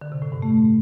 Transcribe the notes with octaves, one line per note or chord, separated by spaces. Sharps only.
D3
C3
A2
G2
A3